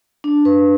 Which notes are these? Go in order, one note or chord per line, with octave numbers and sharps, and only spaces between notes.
D4
B4